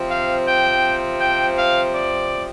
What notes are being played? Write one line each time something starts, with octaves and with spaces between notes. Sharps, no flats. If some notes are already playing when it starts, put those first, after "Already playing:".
Already playing: C3 F3 C4
F5
G5
G5
F5
D5